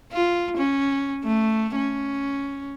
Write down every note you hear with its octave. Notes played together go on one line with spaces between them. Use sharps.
F4
C#4
A3
C#4